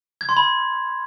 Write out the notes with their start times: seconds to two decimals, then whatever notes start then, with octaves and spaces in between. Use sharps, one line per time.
0.21 G#6
0.29 C6
0.37 B5